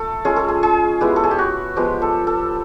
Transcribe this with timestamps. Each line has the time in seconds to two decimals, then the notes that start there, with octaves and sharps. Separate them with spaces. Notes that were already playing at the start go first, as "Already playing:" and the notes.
Already playing: A3 A4
0.25 G#3 C#4 F4 G#4
0.36 A4
0.48 G#4
0.63 G#4
1.01 G#3 B3 E4 G4
1.16 A4
1.24 G#4
1.31 G4
1.39 F#4
1.76 F3 G#3 B3 G4
2.02 A4
2.27 A4